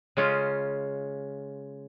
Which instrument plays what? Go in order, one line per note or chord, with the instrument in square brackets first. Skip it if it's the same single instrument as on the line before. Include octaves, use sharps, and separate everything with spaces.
[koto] C#3 G#3 C#4 F4